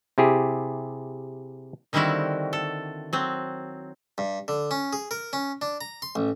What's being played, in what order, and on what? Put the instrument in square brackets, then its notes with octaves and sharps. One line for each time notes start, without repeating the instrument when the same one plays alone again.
[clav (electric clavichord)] C3 E4 G4 G#4
[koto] D3 D#3 G3 C4 E4 F#4
A4
F#3 C4
[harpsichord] G2
D3
C#4
G#4
A#4
C#4
D4
A#5
C6
A1